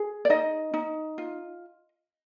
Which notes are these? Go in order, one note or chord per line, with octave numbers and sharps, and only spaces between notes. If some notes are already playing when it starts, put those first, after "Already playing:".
Already playing: G#4
D5
D#4 D#5
D#4
F4